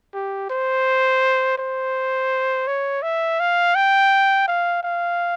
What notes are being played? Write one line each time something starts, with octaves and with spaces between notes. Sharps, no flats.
G4
C5
C5
C#5
E5
F5
G5
F5
F5